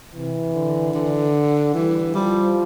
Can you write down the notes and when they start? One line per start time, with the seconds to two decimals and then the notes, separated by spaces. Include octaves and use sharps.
0.14 C3 E3
0.54 D3
0.94 D3
1.74 E3 G3
2.13 F3 G3